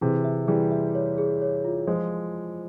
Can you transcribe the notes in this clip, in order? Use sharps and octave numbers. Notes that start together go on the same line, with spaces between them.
C3 E3 G#4
E5
E3 G3 G#4
E5
C#5
G#4
C#5
F4
F3 G#3 C5